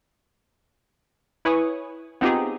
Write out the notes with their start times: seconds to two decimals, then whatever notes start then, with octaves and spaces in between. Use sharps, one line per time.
1.45 E4 B4 C#5 G#5 C#6 D#6
2.21 B3 C4 D#4 F4 G4 G#4